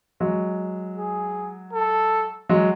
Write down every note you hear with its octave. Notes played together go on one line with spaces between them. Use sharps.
F#3 G#3
G#4
A4
F#3 G#3